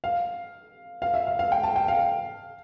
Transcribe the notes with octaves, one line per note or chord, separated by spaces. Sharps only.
F5
F5
E5
F5
F5
G5
A5
G5
F5